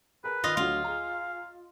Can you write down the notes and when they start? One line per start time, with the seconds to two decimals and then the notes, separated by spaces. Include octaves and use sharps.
0.24 G#4 A#4 B4
0.44 D#3 F4 D#5
0.57 D2 D3 F#3 F4 F5
0.84 G#4 A#5